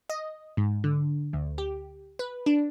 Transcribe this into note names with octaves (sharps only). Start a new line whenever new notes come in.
D#5
G#2
D3
D2
G4
B4
D4